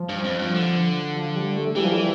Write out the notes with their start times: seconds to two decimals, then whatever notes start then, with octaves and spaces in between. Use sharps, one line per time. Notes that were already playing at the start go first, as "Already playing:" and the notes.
Already playing: F3
0.09 G2
0.24 F2
0.39 G2
0.54 D3
1.15 F3
1.35 G3
1.55 A3
1.76 E3 G3
1.84 F3
1.94 G3